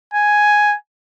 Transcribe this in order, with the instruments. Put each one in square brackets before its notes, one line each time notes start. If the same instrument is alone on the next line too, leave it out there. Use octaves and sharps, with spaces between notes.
[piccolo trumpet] G#5